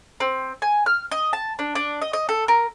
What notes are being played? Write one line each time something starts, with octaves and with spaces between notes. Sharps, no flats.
C4
G#5
F6
D#5
A5
D4
D4
D#5
D#5
A4
A#4